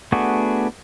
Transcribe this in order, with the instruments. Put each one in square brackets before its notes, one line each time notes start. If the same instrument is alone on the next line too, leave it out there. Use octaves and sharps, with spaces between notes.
[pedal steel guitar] A3 B3 D4 F#4 G#4